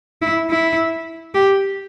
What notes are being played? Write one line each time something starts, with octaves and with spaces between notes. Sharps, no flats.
E4
E4
G4